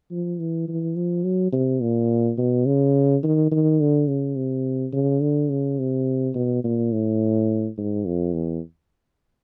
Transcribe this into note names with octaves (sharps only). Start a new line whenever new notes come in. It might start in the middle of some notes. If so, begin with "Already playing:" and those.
F3
E3
E3
F3
F#3
C3
A#2
B2
C#3
D#3
D#3
D3
C#3
C3
C#3
D3
C#3
C3
B2
A#2
A2
G#2
F2
E2